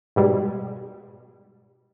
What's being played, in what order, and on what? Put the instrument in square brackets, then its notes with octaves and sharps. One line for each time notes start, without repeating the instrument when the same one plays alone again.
[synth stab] G#2 B2 G3 G#3